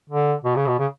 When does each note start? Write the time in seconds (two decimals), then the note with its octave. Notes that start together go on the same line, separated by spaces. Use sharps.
0.09 D3
0.45 B2
0.56 C#3
0.67 B2
0.79 C#3